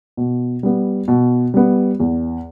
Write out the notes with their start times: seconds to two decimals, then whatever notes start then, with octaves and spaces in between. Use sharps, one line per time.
0.17 B2
0.63 G3 B3
1.08 B2
1.54 G3 B3
2.00 E2